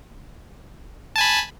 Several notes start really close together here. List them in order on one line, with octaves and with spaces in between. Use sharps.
A5 G#5 B5